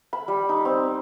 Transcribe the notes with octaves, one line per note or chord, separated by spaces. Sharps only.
B5
G3
D#4
C4